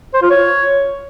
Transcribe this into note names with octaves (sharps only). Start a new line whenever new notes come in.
C5
F4
C#5